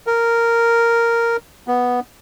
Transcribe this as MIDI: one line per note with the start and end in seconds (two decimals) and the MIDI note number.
0.07 1.37 70
1.68 2.00 59